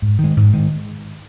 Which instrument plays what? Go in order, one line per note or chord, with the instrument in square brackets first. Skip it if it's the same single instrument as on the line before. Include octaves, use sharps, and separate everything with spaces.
[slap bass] G#2
D#3
G#3
G#2
D#3 G#3